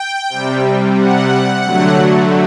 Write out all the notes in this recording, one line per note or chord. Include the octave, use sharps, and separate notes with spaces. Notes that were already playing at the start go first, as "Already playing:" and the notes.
Already playing: G5
C3 G3
F#5
D3 F#3 A3